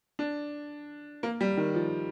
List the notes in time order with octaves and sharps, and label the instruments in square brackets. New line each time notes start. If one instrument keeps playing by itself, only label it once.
[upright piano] D4
A#3
G3
D#3
F3